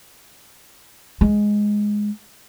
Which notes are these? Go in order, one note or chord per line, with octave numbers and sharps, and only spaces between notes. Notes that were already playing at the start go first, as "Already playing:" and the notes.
G#3